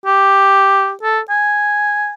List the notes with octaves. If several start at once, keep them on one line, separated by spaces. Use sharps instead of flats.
G4
A4
G#5